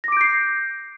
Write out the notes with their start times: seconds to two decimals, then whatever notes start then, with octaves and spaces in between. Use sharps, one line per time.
0.04 A#6
0.08 D6
0.12 D7
0.17 G6
0.21 C7